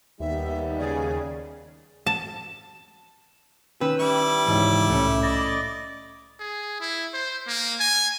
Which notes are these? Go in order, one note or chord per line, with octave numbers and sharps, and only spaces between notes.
D#2 G3 B3 D#4 E5
C#3 G#4 D5
A5
D#3 C#4 B4 G5 E6
G3 E4 D6
C#2 G#2 E3
C2 A2 A3 C#4
D5 D#5
G#4
E4
C5
A#3
G#5